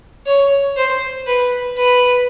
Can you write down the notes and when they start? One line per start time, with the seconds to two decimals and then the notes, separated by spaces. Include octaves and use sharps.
0.26 C#5
0.77 C5
1.27 B4
1.77 B4